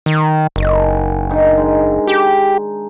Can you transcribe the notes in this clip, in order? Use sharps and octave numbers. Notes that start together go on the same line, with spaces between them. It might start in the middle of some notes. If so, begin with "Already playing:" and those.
D#3
F#1 D#3
D#3 D4 D#4
G#3
G4